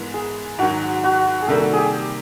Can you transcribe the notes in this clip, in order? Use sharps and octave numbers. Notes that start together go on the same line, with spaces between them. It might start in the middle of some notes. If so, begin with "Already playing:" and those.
Already playing: G#2 E3 G#3 B3 E4 A#4
G#4
G#2 D#3 F#3 F#4
F#4
G#4
C3 D#3 G3 A#3 A4
G4 G#4